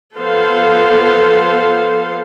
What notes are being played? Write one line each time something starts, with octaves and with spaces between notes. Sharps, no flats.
F3 B3 A4 C5 F5